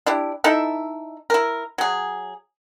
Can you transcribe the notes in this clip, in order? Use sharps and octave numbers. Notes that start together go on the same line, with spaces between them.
D4 E4 G4
D#4 E4 A4 E5
E4 A#4
F#3 G#4